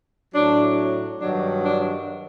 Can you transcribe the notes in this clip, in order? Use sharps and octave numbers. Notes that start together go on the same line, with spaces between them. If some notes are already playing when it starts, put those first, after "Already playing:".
A2 F#3 D4
G2 D#3 F#3 D4
D4